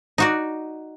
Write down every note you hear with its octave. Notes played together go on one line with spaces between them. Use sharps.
D#4 F#4 D5